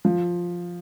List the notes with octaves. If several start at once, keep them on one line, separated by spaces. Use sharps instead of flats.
F3